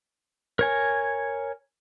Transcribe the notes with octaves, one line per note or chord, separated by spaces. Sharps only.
A#4 C#5 G#5